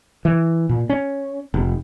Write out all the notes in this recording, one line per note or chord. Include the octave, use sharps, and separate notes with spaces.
E3
A#2
C#4
F1